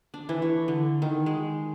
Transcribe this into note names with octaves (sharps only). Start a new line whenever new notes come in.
D4
E3
C#5
D3
D#3
G#3